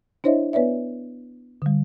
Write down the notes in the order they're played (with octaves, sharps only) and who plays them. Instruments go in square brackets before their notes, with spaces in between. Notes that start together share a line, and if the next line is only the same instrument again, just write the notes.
[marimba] D4 E4 C5 C#5 D#5 E5
B3 B4 C#5 D5 E5
D3 G3